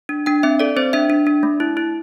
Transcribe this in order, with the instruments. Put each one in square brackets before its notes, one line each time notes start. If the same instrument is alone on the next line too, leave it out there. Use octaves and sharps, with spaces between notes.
[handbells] D4
D4 G5
C4 E5
A4 D5
C4 C5
D4 E5
D4
D4
A3
E4
E4